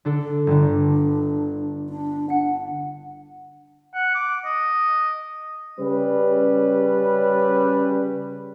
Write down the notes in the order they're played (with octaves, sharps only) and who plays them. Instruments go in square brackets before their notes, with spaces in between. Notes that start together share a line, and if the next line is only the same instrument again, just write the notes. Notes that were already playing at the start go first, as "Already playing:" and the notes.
[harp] D3 D4 A4
[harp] G1 D3 [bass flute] D4
[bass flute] D4
[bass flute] F#5 [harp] C#7
[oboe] F#5
D6
D#5
[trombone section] C#3 G3 C#4 B4